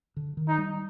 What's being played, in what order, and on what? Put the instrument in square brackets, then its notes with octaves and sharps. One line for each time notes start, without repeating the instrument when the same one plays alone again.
[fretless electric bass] D3
D#3
[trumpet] D#4
[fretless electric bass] G3